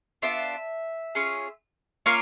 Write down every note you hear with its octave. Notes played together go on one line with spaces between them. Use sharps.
B3 D4 F4 E5
C#4 F4 G#4
A#3 C#4 F4 A#4